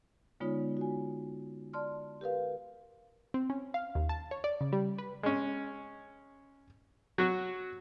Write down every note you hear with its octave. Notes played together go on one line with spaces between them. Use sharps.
D3 G#3 B3 D#4 F4 C#5
F#4 G#5
D5 A5 C6 F6
G4 A#4 B4 F5
C4
C#4
F5
D#2
A5
C#5
D5
C#3
G3
B4
G#3 C#4
F#3 F#4